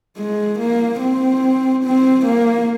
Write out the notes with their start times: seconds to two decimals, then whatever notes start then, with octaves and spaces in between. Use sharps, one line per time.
0.18 G#3
0.59 A#3
1.01 C4
1.84 C4
2.26 A#3